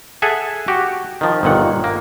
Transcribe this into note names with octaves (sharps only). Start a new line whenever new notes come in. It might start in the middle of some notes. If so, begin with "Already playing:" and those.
G#4 A4 E5 F#5 G#5
F#4 G4
D#3 F3
G1 A#2 D#3 F#5
A#3